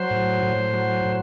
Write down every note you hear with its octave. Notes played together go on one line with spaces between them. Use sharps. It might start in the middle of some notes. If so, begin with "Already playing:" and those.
Already playing: F#3 C5
A2
A2
F#3
A2